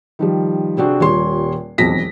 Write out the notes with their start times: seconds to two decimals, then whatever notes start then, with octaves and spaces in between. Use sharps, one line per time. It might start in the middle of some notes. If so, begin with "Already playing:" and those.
0.19 D#3 F3 G3
0.77 C3 C4 D4 F#4 G#4
1.00 D#1 A#2 G3 C#5 C6
1.78 E1 B1 F2 A#6 B6